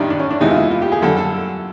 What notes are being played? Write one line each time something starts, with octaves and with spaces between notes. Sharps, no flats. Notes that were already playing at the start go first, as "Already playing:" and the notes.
Already playing: A1 G2 D#3 G3 D4 D#4
D4
C#4
D4
E2 C3 E3 G#3 D#4
F4
E4
F4
G4
G#4
F#2 D3 G3 A4
A4